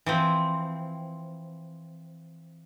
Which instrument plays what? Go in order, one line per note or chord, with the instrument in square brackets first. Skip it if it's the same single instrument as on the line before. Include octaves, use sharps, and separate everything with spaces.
[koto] E3 F3 C4